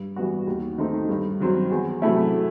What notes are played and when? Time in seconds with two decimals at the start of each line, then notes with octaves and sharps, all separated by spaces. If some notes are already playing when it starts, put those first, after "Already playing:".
Already playing: G2
0.16 E3 G3 B3 F#4
0.47 D#2
0.78 D#3 A3 C4 D#4
1.09 G2
1.40 D#3 F#3 C4
1.71 E2
2.02 C3 F#3 A3 E4